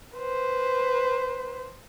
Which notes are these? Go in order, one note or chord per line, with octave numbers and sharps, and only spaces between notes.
B4 C5